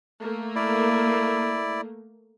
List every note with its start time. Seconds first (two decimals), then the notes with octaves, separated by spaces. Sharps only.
0.20 A3 A#3
0.55 E4 D5